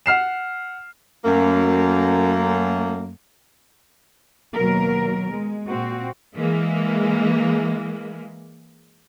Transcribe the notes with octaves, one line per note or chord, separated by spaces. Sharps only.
F#5 F6 C7 E7
F#2 A3 A#3
D#2 B2 F#3 A#4
G#3
A#2 C4 F#4
E3 G#3 A#3